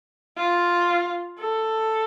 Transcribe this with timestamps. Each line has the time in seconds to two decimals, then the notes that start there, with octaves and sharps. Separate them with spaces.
0.38 F4
1.39 A4